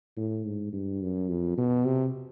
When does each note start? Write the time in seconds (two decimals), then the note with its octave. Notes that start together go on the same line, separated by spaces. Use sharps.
0.17 A2
0.45 G#2
0.73 G2
1.01 F#2
1.29 F2
1.58 B2
1.85 C3